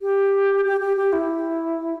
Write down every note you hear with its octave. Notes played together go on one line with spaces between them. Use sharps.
G4
G4
G4
G4
E4